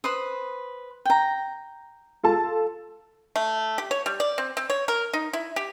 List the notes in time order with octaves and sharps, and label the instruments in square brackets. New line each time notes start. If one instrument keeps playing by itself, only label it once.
[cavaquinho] B4 C5 D#6
G5 A#5
[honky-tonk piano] F4 A4 A5
[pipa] A3
G4
C#5
G3
D5
C4
C4
C#5
A#4
D#4
E4
G4